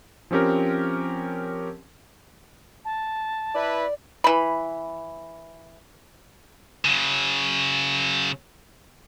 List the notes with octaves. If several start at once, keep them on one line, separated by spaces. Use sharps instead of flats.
F3 C4 C#4 G4 A#4
A5
E4 B4 D5
E3 B5
C#3 F#3